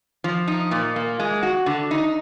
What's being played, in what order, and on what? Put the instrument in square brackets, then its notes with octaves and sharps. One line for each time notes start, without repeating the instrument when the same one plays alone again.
[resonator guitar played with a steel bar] F3
D#4
A#2
A#3
G#3
F#4
D3
D#4